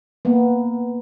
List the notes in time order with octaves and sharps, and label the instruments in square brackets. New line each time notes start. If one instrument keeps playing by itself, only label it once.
[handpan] A#3 B3